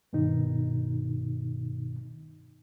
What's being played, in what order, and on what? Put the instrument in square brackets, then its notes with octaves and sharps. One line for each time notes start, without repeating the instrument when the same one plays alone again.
[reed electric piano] G2 B2 D#3 D#4